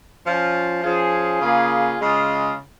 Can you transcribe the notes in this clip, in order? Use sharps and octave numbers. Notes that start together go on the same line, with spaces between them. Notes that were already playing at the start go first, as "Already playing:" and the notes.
F3 C#4 F4
F3 C#4 F4 G#4
C#3 A#3 F4 G#4
C#3 G#3 F4